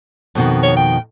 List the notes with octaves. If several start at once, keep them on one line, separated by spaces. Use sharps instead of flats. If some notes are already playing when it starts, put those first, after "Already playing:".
F2 B2 D#3
C#5
G5